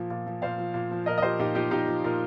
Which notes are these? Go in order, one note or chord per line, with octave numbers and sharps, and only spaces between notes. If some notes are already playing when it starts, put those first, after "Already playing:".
Already playing: A#2 F3
A#2
F3
A#2 C5 F5
F3
A#2
F3
A#2 A#4 D#5
D#5
F3 G4 C5
A#2 D#4 G4
F3 D#4 G4
A#2 D#4 G4
F3
A#2 A#4